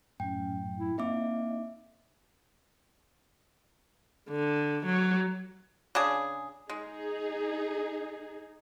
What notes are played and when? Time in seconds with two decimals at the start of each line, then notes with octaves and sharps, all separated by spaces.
0.20 F#2 A2 C#4 G5
0.79 E4
0.98 A#3 C4 D#4 E5 D6
4.30 D3
4.86 F#3
5.95 C#3 D4 G#4
6.70 G#3 D#4 G#4